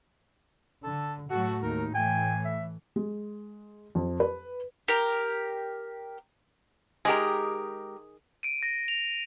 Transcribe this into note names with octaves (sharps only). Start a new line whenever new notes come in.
D3 A4
A2 F#3 A3 F#4 A4 F#5
D#2 D#4 A#4
A2 E3 G5 G#5
E5
G#3
F2
B4
G4 A#4
D#3 G#3 G4 G#4 A#4
D7 D#7
A#6
F7